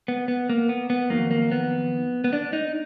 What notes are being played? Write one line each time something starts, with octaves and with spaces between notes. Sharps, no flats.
B3
B3
A#3
B3
B3
F2 D#3 F#3 A#3
A#3
B3
B3
D4
D#4